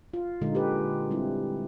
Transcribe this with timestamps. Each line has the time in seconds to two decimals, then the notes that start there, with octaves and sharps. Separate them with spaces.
0.14 F4
0.41 A#2 D3 G#3 D#4
0.55 G4 B4
1.11 G3 C4 E4